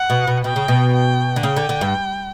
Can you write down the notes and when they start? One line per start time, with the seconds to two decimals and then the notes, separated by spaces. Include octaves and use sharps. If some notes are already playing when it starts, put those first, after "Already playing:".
Already playing: F#5
0.10 B2
0.27 B2
0.44 B2 G5
0.56 C#3
0.68 B2
0.94 G5
1.36 D3
1.43 C#3 G5
1.56 D3
1.69 D3
1.81 G2